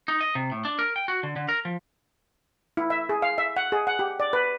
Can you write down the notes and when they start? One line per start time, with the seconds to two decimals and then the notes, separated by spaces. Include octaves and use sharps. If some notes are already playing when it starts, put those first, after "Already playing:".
0.08 D#4
0.21 D#5
0.35 C3
0.52 A2
0.65 D4
0.79 A#4
0.96 G5
1.08 F#4
1.23 D3
1.36 D3
1.49 A#4
1.65 F3
2.77 E4
2.90 E5
3.09 G#4
3.22 F5
3.38 E5
3.57 F#5
3.72 G#4
3.87 F#5
3.99 G4
4.20 D5
4.33 B4